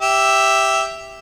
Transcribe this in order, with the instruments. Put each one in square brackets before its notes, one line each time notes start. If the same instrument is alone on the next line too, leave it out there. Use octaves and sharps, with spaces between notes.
[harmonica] G4 E5